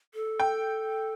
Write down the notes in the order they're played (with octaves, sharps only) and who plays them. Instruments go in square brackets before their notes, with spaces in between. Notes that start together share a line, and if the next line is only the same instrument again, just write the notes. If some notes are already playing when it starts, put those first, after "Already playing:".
[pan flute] A4
[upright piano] G5